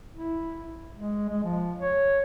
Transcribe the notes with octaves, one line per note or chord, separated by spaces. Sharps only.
E4
G#3
G#3
F3
C#5